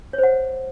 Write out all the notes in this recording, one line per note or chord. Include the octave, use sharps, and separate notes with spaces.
C#5
C5
F#5